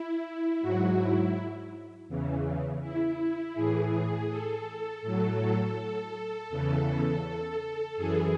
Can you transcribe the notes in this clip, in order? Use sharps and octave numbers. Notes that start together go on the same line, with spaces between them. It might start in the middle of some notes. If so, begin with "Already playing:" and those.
Already playing: E4
G#2 F#3 F#4
E4
E2 C#3 E3
E4
A2 E3 G#4
A4
A2 F#3 A4
E2 C#3 E3
F#2 E3 G#4